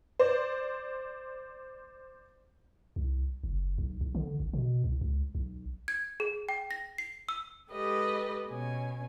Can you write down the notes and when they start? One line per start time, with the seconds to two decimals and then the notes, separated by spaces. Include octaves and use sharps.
0.19 C5 D5
2.96 C2
3.44 F#1
3.78 B1
4.01 B1
4.15 D3
4.40 G#1
4.53 B2
4.84 C2
5.01 C#2
5.35 B1
5.88 G#6
6.20 G#4
6.49 G5
6.71 A#6
6.98 C7
7.29 E6
7.71 G#3 G4 A4 B4 D#5
8.48 B2 C#4 G#5